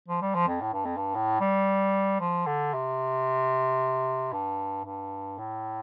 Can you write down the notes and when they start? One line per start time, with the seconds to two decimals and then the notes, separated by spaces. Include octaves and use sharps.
0.08 F3
0.22 G3
0.35 F3
0.48 F2
0.61 A2
0.73 G2
0.85 F2
0.97 G2
1.15 A2
1.40 G3
2.20 F3
2.46 D3
2.73 C3
4.32 G2
4.85 G2
5.39 A2